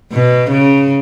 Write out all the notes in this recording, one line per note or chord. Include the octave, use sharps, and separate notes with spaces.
B2
C#3